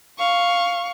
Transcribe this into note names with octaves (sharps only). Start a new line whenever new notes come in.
F5 C#6